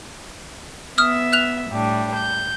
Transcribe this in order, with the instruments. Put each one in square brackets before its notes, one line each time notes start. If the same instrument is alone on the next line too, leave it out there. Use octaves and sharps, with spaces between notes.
[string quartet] B3 E5 [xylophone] D#6 F6
[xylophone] F6 F#6 F7
[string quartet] A2 G3 D4
G6